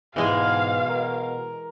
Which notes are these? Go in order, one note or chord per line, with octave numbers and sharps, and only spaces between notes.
G#2 B2 E3 G#3 G#4 F5
A#4